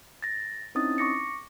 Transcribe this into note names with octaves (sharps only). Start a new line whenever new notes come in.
A6 A#6
C4 C#4 D#4 E4 D#6 A6
C#6 D6 A#6 C#7